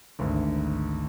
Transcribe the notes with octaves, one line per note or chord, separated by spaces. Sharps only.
G#1 D2